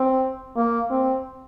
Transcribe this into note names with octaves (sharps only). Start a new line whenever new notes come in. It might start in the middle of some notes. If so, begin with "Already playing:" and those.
Already playing: C4
A#3
C4